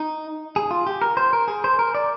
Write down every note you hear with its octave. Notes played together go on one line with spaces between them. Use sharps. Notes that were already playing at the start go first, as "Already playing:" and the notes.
Already playing: D#4
G#4
F4
G4
A#4
C5
A#4
G#4
C5
A#4
D5